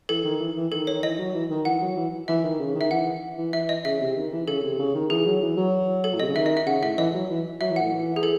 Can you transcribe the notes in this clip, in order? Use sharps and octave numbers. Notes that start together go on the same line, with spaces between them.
E3 A4
D#3
E3
E3
D#3 A4
D#3 C#5
E3 D#5
F#3
E3
D#3
E3 F#5
F#3
E3
E3 E5
D#3
C#3
D#3
E5
E3 F#5
E3
E3 E5
D#5
C#3 E5
C3
D#3
E3
C#3 A4
C3
C#3
D#3
E3 G#4
F#3
E3
F#3
A4
A2
C3 D#5
C#3
D#3 E5
D#5
E5
C#3 F#5
A2 E5
E3 D#5
F#3
E3
F#3 E5
E3
F#5
A2
E3
G#4
A4